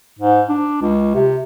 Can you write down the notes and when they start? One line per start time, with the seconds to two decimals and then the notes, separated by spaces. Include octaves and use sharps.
0.19 G#2
0.49 D4
0.82 C#2
1.14 C3